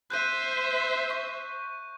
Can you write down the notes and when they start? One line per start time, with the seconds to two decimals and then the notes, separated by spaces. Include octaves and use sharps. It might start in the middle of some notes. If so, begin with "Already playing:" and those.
0.10 C5 E5 F#6 G6 D#7
1.10 C#6